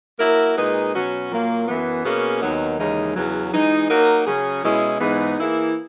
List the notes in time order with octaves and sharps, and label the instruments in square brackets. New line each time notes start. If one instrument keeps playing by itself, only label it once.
[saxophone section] F#3 A#3 E4 A#4
A#2 G#3 D#4 G#4 B4
B2 F#3 C#4 F#4
A#2 F#3 A#3
F#2 E3 B3
B2 A#3 C#4 G#4
D#2 D#3 F#3 B3 D#4
D#2 C#3 E3 G#3 D#4
E2 C#3 F#3
E3 G#3 D#4
F#3 A#3 D#4 A#4
C#3 F#3 C#4 G#4
B2 G#3 C#4 E4
G#2 E3 G#3 B3 D#4
E3 A#3 E4 G#4